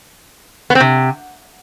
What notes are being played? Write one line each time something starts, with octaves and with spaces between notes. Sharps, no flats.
B3
C4
C3